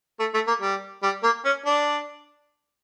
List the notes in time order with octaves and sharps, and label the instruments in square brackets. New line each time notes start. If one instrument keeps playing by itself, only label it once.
[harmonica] A3
A3
A#3
G3
G3
A#3
C#4
D4